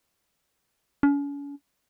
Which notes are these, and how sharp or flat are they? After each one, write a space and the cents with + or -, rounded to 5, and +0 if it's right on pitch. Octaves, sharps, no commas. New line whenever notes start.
C#4 +40